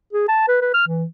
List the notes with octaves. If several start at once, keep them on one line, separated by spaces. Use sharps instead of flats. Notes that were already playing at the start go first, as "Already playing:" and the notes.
G#4
A5
B4
B4
F6
E3